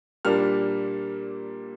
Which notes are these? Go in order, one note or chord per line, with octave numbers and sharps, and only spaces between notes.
A#2 G3 A#3 D4 F6